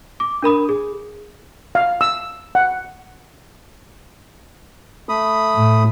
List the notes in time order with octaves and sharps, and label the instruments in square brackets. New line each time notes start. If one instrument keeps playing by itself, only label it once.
[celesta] D6
D4 A#4 B5 D#6
G#4
[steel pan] F5
E6
F#5
[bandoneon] A3 B5 D#6
[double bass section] A2